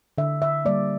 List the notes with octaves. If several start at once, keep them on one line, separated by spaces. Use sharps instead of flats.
D3 E5
E5
G3 A#3 D5